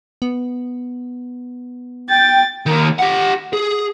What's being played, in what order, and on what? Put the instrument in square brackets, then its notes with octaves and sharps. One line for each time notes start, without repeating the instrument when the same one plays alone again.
[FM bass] B3
[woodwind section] G5 [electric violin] A6
[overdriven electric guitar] D#3 A#3
G4 F#5
G#4